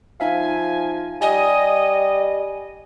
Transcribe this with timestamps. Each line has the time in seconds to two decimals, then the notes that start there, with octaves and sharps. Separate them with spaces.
0.20 F3 D#4 E5 F5 G#5
1.21 G3 D#5 G#5